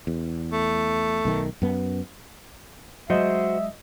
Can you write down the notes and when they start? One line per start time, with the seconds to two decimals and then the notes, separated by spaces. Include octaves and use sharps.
0.07 E2
0.52 A3
1.25 B1 D#3
1.62 F#2 B3
3.10 F#3 G#3 F#4 C5 D#5 E5